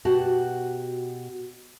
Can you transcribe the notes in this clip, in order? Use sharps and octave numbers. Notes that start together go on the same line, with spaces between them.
B2 F#4 G4 F#5 A5